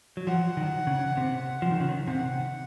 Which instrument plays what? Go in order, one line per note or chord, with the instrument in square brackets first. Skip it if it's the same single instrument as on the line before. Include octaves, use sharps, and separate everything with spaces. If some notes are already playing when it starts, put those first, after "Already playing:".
[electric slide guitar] F#3
[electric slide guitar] F3 [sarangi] F#5
[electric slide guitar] D#3
C#3
C3
F3
D#3
C#3
D#3
[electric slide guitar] C3 [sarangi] F#5